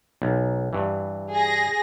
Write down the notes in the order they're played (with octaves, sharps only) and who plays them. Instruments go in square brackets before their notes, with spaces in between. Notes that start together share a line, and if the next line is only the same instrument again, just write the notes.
[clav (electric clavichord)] B1
G2 E3
[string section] G#4 A#6